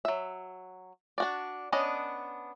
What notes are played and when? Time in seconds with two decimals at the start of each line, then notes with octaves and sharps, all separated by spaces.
0.05 F#3 E5
1.18 D4 F#4 D5
1.72 B3 C#4 D4 D#5